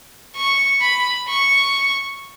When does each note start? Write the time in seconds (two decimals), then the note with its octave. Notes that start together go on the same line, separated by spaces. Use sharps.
0.36 C#6
0.81 B5
1.28 C#6